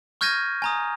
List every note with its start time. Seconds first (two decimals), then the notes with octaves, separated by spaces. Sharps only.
0.21 C#6 F6 G6 G#6 A#6 D#7
0.62 G#5 A#5 D#6